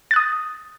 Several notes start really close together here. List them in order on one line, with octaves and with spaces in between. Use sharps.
A6 F#6 D#6